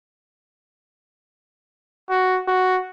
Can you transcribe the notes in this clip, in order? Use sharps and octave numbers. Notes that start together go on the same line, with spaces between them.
F#4
F#4